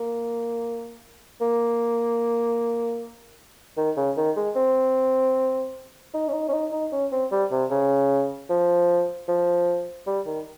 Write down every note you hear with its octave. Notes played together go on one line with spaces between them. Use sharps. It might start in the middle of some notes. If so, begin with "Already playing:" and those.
Already playing: A#3
A#3
D#3
C#3
D#3
G#3
C4
D#4
C#4
D#4
C#4
D#4
D#4
C#4
C4
G3
C3
C#3
F3
F3
G3
D#3